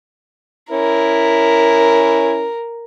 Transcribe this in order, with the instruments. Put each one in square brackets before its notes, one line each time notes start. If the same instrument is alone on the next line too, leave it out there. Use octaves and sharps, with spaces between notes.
[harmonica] C#4 E4 [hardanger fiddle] A#4